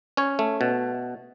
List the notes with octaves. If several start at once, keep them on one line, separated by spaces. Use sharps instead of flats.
C#4 C#5
A3
B2